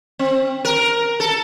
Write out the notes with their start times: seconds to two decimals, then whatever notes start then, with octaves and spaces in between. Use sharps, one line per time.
0.19 C4
0.65 A#4
1.20 A4